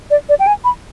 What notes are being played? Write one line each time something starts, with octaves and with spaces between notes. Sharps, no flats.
D5
D5
G5
G#5
B5